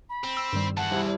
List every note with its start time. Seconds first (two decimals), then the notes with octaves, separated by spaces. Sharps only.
0.09 B5
0.24 C4
0.37 E6
0.53 G2 D#3 G3
0.77 E2 F#5 A5
0.91 G3 E4 C5